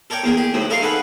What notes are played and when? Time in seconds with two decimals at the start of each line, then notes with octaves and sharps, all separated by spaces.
0.10 A4 A#4 C#5 D5 G5
0.24 E2 A#2 A#3 G#4
0.37 G4 G#4
0.54 D2 A2 D#3 F#3
0.70 A4 A#4 D#5 F5 C6 C#6
0.82 D#4 G#4 A4 B4 F#5